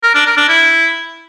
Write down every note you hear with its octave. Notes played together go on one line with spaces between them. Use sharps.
A#4
D4
A#4
D4
E4